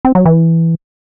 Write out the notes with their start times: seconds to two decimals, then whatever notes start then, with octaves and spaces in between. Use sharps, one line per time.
0.05 C4
0.15 F#3
0.25 E3